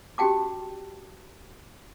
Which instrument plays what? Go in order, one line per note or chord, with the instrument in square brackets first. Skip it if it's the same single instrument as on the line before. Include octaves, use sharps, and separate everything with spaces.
[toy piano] C#4 F#4 G4 G5 A5 D6